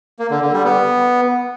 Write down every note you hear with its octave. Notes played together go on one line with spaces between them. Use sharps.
A#3
D3
D3
G3
B3